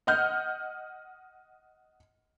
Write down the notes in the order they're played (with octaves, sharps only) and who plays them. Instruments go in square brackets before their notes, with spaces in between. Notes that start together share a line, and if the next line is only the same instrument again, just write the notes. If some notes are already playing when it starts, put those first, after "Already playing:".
[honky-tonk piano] D#5 F#5 F6 G6